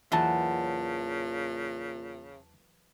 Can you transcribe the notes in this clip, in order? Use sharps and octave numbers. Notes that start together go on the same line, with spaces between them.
E2 A#2 C#3 E3 F#3 E4 A5